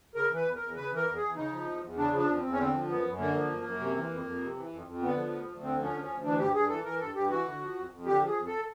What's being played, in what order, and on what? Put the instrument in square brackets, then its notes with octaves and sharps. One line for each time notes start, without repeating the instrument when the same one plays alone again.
[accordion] C#3 A#4
E3
B4
E2
A#4
E2
C#3 B4
E3
A#4
E2
G#4
E2
C#3 D#4
F3
E2
E2
C#3 D4
F3
D4
E2
C4
E2
C#4
D3 C4
F3
F#2 B3
F#2
D3 A#3
F3
F#2
F#2
C3
E3
F2
F2
C3
E3
F2
F2
D3 B3
F3
D2
D2
D3 C4
F3
C#4
D2
C#4
D2
E3 D4
G2 G4
G2 G#4
E3 A4
E3 A#4
G2 A4
G2 G4
E3 F#4
D3
F3
F2
F2
D3 G4
F3
G#4
F2
A4